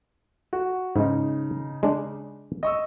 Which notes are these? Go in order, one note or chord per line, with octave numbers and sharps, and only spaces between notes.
F#4
G#2 C#3 G#3 D#4
G#3 D4
D#5 C#6 E6